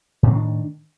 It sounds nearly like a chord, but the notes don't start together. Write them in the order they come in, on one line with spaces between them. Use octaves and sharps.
A2 C4 D#3 D4